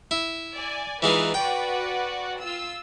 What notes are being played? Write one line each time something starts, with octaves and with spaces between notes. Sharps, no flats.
E4
D5 G#5
E3 G#3 D#4 F4 B4 E5
F#4 B4 D5 G5
F4 E6